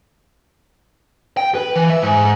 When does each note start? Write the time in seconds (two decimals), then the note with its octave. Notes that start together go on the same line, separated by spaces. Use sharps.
1.37 G5
1.55 B4
1.76 E3
1.90 E5
2.02 G#2